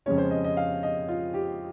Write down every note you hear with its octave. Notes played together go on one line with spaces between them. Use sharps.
F2 C#3 G#3 C#4 C#5
C5
D#5
D#5
F5
D#5
F4
G4